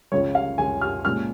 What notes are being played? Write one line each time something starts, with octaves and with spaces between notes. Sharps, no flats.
C#2 C#3 F3 C#5
F5
C#2 C#3 F3 G#5
F6
A#2 F3 G#3 C#4 F6